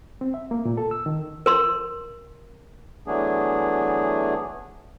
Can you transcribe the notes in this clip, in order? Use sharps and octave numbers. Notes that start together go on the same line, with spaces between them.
C4
E5
A#3
A#2
A4
E6
D#3
A#4 C6
E3 F#3 A3 B3 D4 G#4